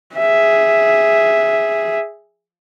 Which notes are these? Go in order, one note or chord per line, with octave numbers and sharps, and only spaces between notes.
G#4 E5